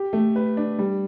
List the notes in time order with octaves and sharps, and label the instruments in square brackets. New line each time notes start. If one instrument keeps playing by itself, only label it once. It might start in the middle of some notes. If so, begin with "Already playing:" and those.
Already playing: [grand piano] G4
A3
B4
D4
G3